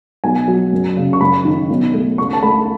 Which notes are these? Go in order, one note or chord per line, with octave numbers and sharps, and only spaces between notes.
B1 G#5
F#3
F#1
C#3
C#6
F#1 B5
D#3
B1
A3
C#2 C#6
A5
A3 B5